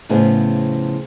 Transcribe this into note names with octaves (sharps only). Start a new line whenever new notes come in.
A2 C#3 F3 B3 G#4 C5